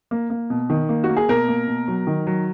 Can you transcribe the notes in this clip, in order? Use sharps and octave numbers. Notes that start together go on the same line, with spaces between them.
A#3
A#3
B2
D#3
A#3
F#4
A#3
G#4
B2 A#4
A#3
B2
F#3
D#3
F#3